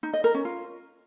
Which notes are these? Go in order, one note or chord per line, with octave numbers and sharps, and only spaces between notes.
D#4
D#5
A#4
C#4
F4